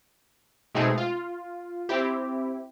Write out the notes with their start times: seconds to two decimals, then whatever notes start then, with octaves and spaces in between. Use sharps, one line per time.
0.75 B2 G#3 A3 C4 D#4 G#4
0.98 F4
1.89 C4 E4 G4